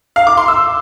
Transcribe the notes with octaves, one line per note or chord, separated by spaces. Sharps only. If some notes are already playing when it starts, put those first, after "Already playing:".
F5
D6
C6
E6